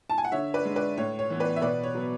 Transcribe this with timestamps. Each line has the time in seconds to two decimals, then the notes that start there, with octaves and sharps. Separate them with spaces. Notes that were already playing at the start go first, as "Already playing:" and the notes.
0.10 A5
0.18 G#5
0.24 F#5
0.32 D3 C#5 E5
0.54 B4 D5
0.65 G#3 D4
0.76 B4 D5
0.97 A2 C#5
1.19 C#5
1.30 E3 B3
1.40 B4 D5
1.56 E5
1.62 B2 B4 D5
1.83 C#5
1.95 F#3 B3